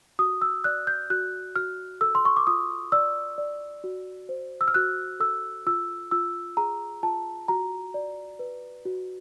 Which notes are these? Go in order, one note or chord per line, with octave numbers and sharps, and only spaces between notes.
F#4 D#6
E6
D5 F#6
G6
F#4 F#6
F#4 F6
A4 E6
C6
C#6
D6
F4 D#6
D5 E6
D5
F#4
C5
E6
F6
F#4 F#6
A4 E6
F4 E6
F4 E6
G#4 A#5
F4 A5
F#4 A#5
D5
B4
F#4